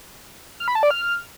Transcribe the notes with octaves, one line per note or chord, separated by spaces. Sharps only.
F6
B5
A5
D5
F6